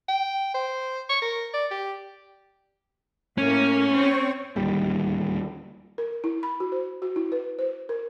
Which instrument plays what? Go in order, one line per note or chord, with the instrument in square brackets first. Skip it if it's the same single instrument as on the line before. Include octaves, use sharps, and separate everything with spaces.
[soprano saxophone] G5
C5
C#6
A#4
D5
G4
[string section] A2 A#3 [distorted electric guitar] C#4
[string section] C4 C#5
[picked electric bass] D1 D#2 G3
[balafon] A#4
E4
B5
F#4
C5
F#4
E4
B4
C5
A#4